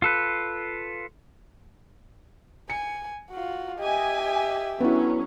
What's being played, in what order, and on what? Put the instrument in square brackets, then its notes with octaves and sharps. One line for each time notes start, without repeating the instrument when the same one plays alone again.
[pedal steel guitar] F4 A4 B4
[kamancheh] G#5 [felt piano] C#7
[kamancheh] F4 F#4
[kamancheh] G4 E5 [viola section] D#5 G#5
[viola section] D3 F#3 C#4 [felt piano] B3 E4